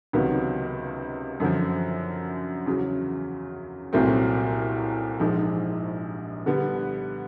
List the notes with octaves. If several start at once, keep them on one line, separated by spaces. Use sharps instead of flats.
C#2 C3 D#3 F#3 B3
F#2 D3 F3
E2 C#3 F#3
C2 A#2 F#3 A3 C4
A#1 G#2 F3 G#3
D3 G3 B3